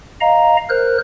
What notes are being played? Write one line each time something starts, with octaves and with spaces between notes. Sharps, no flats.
D#5 F5 A#5
A#4 C5 F#6